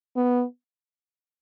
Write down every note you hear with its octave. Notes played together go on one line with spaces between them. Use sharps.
B3